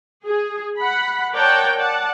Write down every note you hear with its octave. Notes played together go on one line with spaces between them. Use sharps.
G#4
F#5 B5
A#4 C#5 D5 F#5 G5 A5
D5 F#5 A5